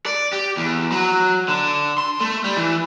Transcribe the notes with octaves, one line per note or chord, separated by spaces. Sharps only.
D5
G4
E2
F#3
D3
C6
A3
G3
E3